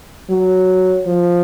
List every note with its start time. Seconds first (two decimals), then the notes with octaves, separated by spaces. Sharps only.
0.30 F#3
1.07 F3